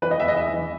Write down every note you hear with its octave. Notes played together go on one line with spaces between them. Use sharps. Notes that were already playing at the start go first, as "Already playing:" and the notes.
E3 B4
D#5
E2 E5
D#5
E3 E5
E3